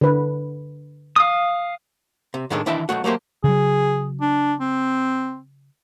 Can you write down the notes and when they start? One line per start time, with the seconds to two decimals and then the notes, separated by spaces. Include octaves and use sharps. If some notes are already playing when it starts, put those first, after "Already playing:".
0.01 D3 B4
1.16 F5 D#6
2.34 C3
2.50 A2 D#3 G#3 D4 A4
2.66 D#3 E3 D4 E4 G5 A5
2.89 B1 C#3 A3 F#4
3.04 F#3 A3 A#3 G4 C5
3.44 C#3 F#3 G#4
4.21 D4
4.60 C4